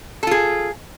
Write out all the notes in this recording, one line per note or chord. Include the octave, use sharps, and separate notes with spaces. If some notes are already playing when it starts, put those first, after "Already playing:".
F4 G#4 A4